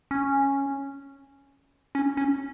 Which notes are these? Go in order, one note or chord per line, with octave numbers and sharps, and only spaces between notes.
C#4
C#4
C#4